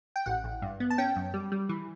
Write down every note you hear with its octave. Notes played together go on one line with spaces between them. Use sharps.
G5
A1 F#5
A1
G2
B3
A5
C#4 G5
F#2
G3
G3
E3